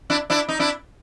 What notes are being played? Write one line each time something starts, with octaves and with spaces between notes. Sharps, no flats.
D4 E4
D4 E4
D#4
D4 E4